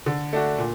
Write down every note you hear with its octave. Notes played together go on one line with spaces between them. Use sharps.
D3
A3 D4 F#4
A#2